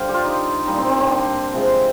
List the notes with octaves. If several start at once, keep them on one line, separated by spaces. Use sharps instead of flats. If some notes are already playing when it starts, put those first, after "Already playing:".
Already playing: D3 G3 C5 F5
F4 G4
D#4
A#2 G3 D#4
C4
C4
C4
D4
C3 F3 G#3